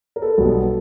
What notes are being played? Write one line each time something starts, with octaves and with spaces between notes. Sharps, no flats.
A#4
A4 B4
B1 B2 G3 B3